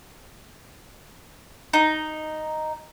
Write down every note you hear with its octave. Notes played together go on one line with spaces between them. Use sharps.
D#4